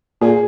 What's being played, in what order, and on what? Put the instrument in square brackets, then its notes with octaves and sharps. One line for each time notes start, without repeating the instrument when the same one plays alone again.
[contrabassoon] A#2 [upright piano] G#4